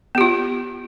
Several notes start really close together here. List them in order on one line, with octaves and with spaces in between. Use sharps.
B3 G4 F4